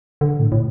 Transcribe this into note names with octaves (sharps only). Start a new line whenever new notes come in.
D3
A2
A2